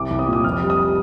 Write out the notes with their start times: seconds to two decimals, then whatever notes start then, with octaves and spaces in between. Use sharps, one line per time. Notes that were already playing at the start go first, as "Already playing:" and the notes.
Already playing: C2 D6
0.11 C2
0.19 D#6
0.26 A#2 D6
0.33 D#6
0.44 F1 F6
0.61 G3
0.70 D#6